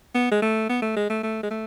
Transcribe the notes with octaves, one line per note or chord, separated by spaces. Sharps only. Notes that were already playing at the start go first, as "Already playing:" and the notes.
B3
G#3
A3
B3
A3
G#3
A3
A3
G#3
A3